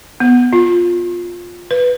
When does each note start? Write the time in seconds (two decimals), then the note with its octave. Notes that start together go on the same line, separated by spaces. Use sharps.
0.20 B3
0.53 F4
1.71 B4